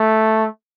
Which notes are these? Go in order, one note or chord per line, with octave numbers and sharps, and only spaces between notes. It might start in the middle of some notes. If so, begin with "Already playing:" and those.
Already playing: A3